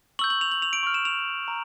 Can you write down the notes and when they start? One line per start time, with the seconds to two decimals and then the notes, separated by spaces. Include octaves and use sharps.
0.19 C#6 E6 G6 F#7
0.30 F#7
0.41 F7
0.51 F#7
0.62 F7
0.73 D7
0.83 C#6 F6
0.94 E7
1.05 F7
1.48 A#5